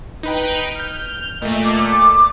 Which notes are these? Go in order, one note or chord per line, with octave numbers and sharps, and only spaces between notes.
D#4 B4 G5
F6 G6
A#2 A3 D#5
D6